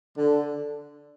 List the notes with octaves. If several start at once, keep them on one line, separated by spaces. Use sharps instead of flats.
D3